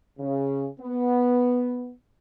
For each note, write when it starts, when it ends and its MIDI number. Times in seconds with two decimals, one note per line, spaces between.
0.19 0.67 49
0.80 1.92 59